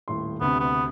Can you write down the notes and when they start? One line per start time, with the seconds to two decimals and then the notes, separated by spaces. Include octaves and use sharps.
0.08 D#1 A2 C6
0.41 D2 C3 B3
0.60 B3